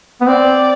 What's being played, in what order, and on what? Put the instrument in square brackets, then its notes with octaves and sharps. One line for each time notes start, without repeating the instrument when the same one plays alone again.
[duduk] B3
[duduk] C4 [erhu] D5